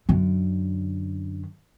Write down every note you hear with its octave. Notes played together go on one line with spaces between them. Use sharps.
F#2 D3